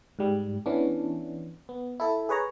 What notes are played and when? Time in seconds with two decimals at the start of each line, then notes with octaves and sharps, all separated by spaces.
0.19 G#2 G3
0.66 E3 B3 C#4 D4
1.69 B3
2.00 E4 A4
2.29 G#4 B4 C#5 A#5